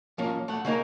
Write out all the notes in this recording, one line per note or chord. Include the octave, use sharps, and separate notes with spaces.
F3 A#3 C#4
A3 F#5
C#3 A#3 D#4 A#4